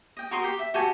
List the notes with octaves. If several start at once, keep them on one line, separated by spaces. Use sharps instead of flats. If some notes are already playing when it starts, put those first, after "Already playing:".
D#5 G5
F#4 A#4 C6 D#6
G4
E5
F#4 G4 A4 G#5